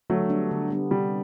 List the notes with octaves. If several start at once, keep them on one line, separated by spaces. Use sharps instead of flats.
D3 F#3 A3
G3 B3 D4
D3
G3 B3 D4
C3 G3